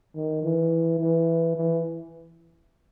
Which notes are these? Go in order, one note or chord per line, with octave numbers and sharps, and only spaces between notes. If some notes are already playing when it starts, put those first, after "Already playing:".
D#3
E3
E3
E3